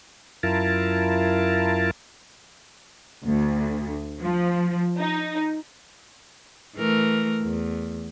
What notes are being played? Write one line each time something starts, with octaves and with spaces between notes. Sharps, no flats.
F#2 E4 F4 A#4 A5
D2
F3
D#4
E3 A3 A#4
E2